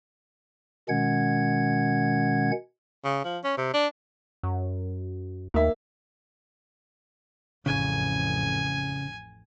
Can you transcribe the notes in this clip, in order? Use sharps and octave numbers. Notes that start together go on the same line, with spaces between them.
B2 D#3 G#3 C#4 F#5 G#6
C#3
F3
C#4
C3
D4
F#2
D#2 A#3 E5
A1 F2 C#3 G#5